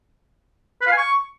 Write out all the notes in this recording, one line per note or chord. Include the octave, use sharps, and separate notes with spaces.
B4
F5
G#5
C#6